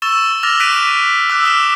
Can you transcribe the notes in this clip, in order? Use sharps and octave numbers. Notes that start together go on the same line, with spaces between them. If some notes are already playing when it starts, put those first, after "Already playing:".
C#6 E6 A6 E7 G7
D6 E6 F6 A6 A#6 F7
F6 F#6 B6 D7 D#7
D6 E6 F#6
D#6 F6 B6 E7